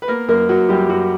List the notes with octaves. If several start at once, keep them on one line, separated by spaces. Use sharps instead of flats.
B4
A#3 B3 A#4
F#2 A#3 A#4
F#2 F#3 F#4
F#2 G3 G4
F#2 F#3 F#4